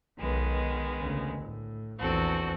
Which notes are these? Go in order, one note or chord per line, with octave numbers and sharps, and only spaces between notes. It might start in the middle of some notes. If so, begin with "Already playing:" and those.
B1 D#3 G#3 B3
D2 C#3
A2
A#1 E2 C4 F#4 A4